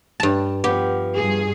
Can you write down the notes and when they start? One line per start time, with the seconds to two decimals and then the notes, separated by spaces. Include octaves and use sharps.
0.20 G2 A5
0.64 F3 B3 G4
1.15 G2 G#4